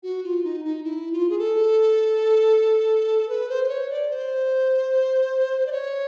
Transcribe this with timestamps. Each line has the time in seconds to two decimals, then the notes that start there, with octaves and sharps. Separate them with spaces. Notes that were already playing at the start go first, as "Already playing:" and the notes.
0.03 F#4
0.24 F4
0.44 D#4
0.65 D#4
0.84 E4
1.12 F4
1.29 G#4
1.38 A4
3.29 B4
3.49 C5
3.64 C5
3.69 C#5
3.90 D5
4.10 C5
5.66 D5
5.72 C#5